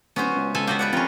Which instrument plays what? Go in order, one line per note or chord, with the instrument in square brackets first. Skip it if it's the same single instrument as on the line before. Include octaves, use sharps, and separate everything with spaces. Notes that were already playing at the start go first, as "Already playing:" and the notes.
[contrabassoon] D1 [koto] B3 [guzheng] C#4 F#4 C5
[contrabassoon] C#2
[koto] C#3 A4 G#5
[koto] B3 F#4 G4 [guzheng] F5
[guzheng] B4 D5 F#5
[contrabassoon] F2 [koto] C#4 F4 [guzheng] A#4